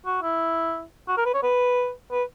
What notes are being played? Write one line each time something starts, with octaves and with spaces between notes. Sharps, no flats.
F#4
E4
F#4
A#4
B4
C#5
B4
B4